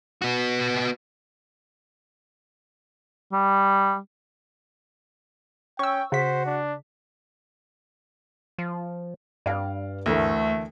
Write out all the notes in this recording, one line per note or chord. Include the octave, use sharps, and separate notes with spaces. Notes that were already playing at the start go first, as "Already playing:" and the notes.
B3 F#4
G3
C#4 G5 C#6 E6
C#3 F#4 C5 B6
D4
F3
G2 D5 F5
D2 D3 E3 A3 A#4